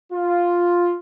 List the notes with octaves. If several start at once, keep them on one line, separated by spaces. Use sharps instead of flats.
F4